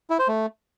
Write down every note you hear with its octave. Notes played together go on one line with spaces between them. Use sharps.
E4
C5
A3